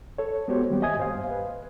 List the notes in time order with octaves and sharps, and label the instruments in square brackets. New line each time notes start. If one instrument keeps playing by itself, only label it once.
[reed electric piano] A4 C#5
G#3 B3 F#4 G4 C5 C#5
D#3 G3 A#3 B3 G4
D#5 E5 G#5 D#6 G#6
G2 C5 F5
B4